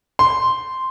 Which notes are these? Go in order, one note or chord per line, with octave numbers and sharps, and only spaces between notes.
C6